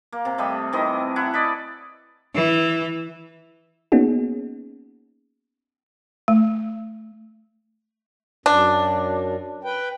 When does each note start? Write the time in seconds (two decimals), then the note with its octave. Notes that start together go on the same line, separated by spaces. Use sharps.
0.12 A#3
0.25 C3
0.38 G3 A3 D#5 E5
0.73 D#3 E3 C4 D#5
1.16 E4 F#5 C#6
1.34 D5 D#5 B5
2.35 E3
3.92 A#3 B3 C#4 D#4 F#4 G#4
6.28 A3
8.46 F#2 D4
9.64 B4 G5